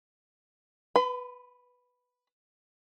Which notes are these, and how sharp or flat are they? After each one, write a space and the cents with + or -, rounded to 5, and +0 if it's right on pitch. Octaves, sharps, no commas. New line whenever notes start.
B4 +0 B5 +45